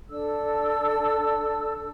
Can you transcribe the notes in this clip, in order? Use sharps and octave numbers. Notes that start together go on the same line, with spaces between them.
D4 A4 E6